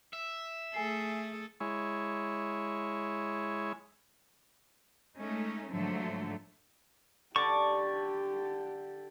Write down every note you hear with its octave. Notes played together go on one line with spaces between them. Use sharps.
E5
A3 G#4 A4 G#5 C7
G#3 E4 C#5
G#3 A3 C#4 D#4
G#2 D3 F3 F#3 A3
D3 G4 C#6 D6